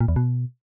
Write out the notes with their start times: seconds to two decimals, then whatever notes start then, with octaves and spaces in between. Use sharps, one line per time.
0.01 A#2
0.08 E2
0.16 B2